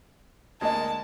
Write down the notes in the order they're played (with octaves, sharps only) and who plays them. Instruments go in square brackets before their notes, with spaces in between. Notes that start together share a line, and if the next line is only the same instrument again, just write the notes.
[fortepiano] D2 G#3 A#3 [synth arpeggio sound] D#5 G#6 [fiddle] A5